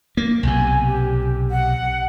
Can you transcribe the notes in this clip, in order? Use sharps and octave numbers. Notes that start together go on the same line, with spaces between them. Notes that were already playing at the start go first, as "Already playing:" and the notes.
A#3
B1 C3 G#5
G4
F#5